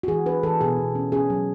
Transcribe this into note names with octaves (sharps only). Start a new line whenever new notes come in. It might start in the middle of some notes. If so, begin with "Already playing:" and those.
F#4
E3 G#4
D4 B4
E3 A4
B2 G#4
B2
C#4
C#4 G#4
F#3